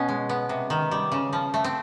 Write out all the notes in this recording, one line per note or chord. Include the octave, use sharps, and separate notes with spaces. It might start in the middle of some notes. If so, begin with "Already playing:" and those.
Already playing: B2 B3 C#4
G#3
B3
C3
D#3
G3
C#3
F3
A3
C4